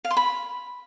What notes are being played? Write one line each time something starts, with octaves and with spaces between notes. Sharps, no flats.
F5
C6
B5